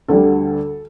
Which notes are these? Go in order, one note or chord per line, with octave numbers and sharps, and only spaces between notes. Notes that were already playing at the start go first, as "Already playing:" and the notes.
D2 D3 G3 A4